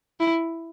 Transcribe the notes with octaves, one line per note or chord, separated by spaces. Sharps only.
E4